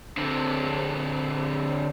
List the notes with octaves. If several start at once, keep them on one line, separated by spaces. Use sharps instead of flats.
D3 C4